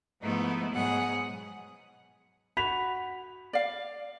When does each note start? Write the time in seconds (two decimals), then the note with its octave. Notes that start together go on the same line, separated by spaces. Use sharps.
0.22 G#2 F3 A3 B3 D#4 E4
0.71 G#2 B2 F#3 G#4 F#5
2.57 F#4 B5 B6 F7
3.53 D5 F5